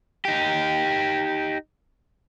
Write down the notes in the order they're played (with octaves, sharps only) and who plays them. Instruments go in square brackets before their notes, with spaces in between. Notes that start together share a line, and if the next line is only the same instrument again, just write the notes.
[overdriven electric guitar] D#4 G4